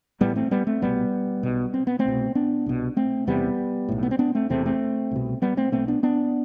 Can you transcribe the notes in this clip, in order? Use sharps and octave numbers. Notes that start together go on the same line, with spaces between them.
A1 A2 G3 B3
A3 C4
G3 B3
A3 C4
C2 B2 G3 B3
B1 B2
C4
B3
A3 C4
C2 B2
B3 D4
C2 B2
A3 C4
E1 E2 C3 G3 B3
B1 A2
B3
C4
B3 D4
A3 C4
E1 E2 C3 A3 C4
A3 C4
C2 B2
G3 B3
A3 C4
B1 B2 A3 C4
B3 D4
B3 D4